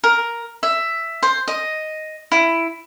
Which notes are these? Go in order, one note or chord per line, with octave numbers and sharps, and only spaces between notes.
A#4
E5
C5
D#5
E4